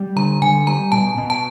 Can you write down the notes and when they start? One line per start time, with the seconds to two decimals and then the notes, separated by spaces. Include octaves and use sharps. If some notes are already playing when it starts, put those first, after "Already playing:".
Already playing: G3
0.16 D3 A#5
0.42 D3 G#5
0.67 G3 A#5
0.92 B2 A5
1.17 B2
1.30 A5